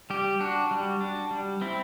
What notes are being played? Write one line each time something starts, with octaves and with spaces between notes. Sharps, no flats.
G3 G4
D4 F#4
G3
D4
G3
C4 E4